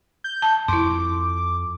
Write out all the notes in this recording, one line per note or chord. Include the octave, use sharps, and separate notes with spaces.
G6
A5
F2 E4 C6 D6